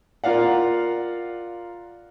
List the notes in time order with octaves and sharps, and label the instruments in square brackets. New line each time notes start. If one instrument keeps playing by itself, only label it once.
[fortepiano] F4 A#4 D5 F5 F#5